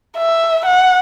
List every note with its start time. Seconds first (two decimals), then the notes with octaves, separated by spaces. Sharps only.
0.18 E5
0.66 F#5